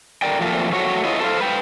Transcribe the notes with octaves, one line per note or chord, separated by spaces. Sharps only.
D3 A#4 D5 G5
F3 A3 A#3 C4 F4
A3 F#4 C#5
E4 F4 B4 D#5
A4 C5 F5
B4 G5